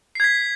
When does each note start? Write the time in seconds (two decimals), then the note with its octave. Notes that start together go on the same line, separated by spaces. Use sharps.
0.15 C7
0.20 G#6
0.24 B6